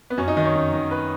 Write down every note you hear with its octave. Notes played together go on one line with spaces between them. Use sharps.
B3
F#2 C#4
D#4
D#3 D#5
C#5
F#2
D#3
B4